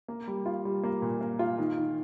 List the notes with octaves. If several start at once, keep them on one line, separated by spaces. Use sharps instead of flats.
A#3
G3
F4
G3
A#3
A#2
A#3
F4
D#3
D#3